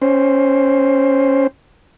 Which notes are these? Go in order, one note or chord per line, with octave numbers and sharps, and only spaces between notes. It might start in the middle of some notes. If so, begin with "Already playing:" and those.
C#4 C5